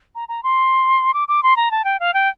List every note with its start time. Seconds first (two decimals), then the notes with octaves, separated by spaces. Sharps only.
0.15 A#5
0.29 A#5
0.43 C6
1.14 D6
1.28 D6
1.43 C6
1.56 A#5
1.71 A5
1.84 G5
2.00 F5
2.14 G5